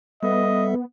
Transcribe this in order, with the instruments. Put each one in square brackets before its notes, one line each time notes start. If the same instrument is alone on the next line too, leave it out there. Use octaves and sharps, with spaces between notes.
[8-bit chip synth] G3 A4 E5 [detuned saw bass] B3 [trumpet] D#5